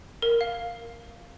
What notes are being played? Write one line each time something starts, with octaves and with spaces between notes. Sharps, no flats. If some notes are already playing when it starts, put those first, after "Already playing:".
A#4
F5